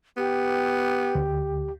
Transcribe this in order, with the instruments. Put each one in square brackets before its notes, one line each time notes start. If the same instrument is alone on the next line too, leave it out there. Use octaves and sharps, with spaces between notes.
[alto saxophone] B3 [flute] G4
[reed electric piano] D2